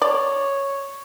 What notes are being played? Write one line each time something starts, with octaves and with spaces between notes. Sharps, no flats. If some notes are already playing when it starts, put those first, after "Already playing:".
C#5 D5